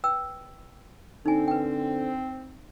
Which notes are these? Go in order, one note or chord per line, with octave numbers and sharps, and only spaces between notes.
B4 G5 E6
D3 C4 D#4 G#5
B4 G5